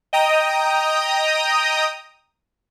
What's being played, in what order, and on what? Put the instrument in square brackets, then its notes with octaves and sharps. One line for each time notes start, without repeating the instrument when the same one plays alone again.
[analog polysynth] D#5 G5 A#5 D#6